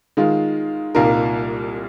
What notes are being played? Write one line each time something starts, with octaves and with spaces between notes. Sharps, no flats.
D#3 G#3 F4
C2 A#2 A#3 D#4 A#4